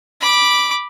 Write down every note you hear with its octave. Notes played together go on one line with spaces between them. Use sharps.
B5 D6